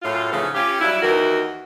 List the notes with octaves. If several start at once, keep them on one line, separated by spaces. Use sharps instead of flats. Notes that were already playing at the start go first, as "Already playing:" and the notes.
F#2 A2 F4
G#2 C#3 E3 F3 A3
C#4 F4 G4
F#3 G3 E4
D#2 D#3 E3 F#4 A#4